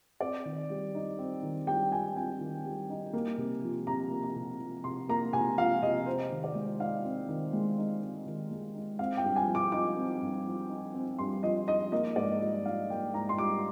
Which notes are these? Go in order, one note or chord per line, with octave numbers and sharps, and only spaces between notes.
C4 D5
D#3
G3
D#4
C4
D#3
G3 G5
D#4 G#5
C4 G#5
D#3
G3
D#4
A#3
C3
F3
C3 A#5
A#3
A#5
C3
F3
C3 C6
A#3 A#5
C3 G#5
F3 F5
C3 D#5
C4 C5
D#3
D5
G#3
D#4 F5
C4
D#3
G#3
D#4
C4
D#3
G#3
D#4
C4 F5
G5
G2
G#5
F3
D6
D#4 D6
C4
G2
F3
D#4
C4
G2 C6
F3 D#5
D#4 D#5
A#3 D#5
G#2 D5
G3 D#5
D#4 F5
A#3 G5
G#2 A#5
C6
G3 D6